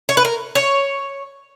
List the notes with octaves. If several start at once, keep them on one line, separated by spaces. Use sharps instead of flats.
C#5
B4
A#4
C#5